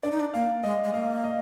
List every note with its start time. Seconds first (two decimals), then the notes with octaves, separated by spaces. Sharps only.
0.03 D4 D5
0.11 D#4
0.20 D4
0.34 A#3 F5
0.63 G#3 D#5
0.84 G#3
0.94 A#3 F5
1.24 D#5